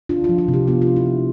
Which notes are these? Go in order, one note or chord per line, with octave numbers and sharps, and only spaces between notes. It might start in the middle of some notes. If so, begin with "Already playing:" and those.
D4 F4
F4
F3
F4
C3
G4
B3 F4
F4
D4
E4
F3